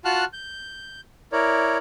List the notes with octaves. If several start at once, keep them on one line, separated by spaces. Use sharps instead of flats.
F4 F#4 F#5 A5 F6 F#6
G6
E4 A#4 C#5 D5